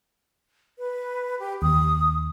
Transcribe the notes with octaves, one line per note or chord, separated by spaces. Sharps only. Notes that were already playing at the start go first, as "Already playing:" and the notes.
B4
G4
D#2 D#6